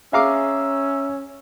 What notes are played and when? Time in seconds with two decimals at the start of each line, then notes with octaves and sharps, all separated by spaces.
0.13 C#4 G#4 E5 F5 A#5 D6 E6